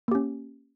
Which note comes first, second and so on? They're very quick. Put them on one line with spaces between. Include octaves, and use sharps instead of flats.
A#3 G4 C#4